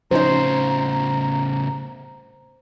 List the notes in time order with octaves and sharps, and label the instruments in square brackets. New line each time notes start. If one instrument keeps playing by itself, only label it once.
[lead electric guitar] A2 C#3 [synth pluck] F3 C#4 D#4 [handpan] C5 [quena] A#5